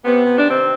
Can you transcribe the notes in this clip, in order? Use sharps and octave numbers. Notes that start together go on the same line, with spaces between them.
C3 B3
C3
D4
D#3 C4